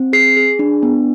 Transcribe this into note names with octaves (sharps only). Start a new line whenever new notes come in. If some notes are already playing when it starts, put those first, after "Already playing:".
Already playing: C4
G#4 C7
G#4
D4
B3